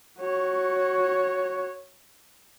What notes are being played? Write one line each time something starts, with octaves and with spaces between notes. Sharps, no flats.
F#4 C#5